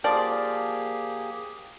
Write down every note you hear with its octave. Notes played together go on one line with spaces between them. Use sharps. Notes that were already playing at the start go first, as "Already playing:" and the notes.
F3 A#3 G4 G#4 D5